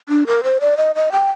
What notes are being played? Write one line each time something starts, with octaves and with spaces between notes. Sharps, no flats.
D4
A#4
C5
D5
D#5
D#5
G5